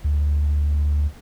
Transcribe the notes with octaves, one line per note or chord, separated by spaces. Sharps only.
D2